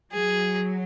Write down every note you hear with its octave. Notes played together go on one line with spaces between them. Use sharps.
F#3 G#4